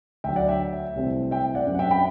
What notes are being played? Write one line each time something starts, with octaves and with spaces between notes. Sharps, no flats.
D2 D3 F#3 E5 G5
D5 F#5
E5 G5
C2 C3 E3 A3 C4
E5 G5
D5 F#5
F#2 F#3 C4
F#5
E5 G5
G5 B5